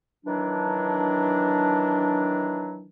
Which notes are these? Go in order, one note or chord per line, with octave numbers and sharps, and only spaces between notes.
D#3 E3 F#3 D4